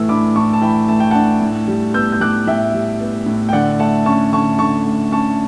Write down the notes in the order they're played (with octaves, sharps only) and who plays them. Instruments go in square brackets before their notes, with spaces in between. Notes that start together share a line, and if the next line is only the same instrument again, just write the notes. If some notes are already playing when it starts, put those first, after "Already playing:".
Already playing: [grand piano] A2 E3 A3 E6
D4 B5 D6
A2 A5 C#6
A5
E3 G5 B5
A3 A5
G5
D4 F#5 A5
A2
G3
B3 E6 G6
G6
A2 D6 F#6
A2 E5 G5
G3
B3
A2
G5
D3 D5 F#5
A3 F#5 A5
C#4 A5 C#6
D3 A5 C#6
D3 A5 C#6
A3
C#4 A5 C#6